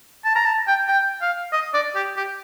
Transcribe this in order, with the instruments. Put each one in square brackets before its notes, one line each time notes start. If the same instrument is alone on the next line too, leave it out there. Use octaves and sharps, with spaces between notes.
[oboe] A5
A#5
A5
G5
G5
F5
D#5
D5
G4
G4